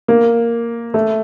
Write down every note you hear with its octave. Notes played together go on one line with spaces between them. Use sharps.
A#3
A3